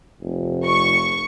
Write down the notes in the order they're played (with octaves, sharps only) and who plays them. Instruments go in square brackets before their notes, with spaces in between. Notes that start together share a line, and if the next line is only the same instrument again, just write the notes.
[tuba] F1
[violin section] C#6